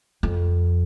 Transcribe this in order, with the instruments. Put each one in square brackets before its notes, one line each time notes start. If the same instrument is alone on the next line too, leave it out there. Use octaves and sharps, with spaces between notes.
[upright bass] F2